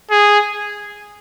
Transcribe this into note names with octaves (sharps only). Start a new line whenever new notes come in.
G#4